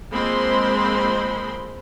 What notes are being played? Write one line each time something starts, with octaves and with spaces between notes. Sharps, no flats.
F3 G#3 A#3 C4 B5 C6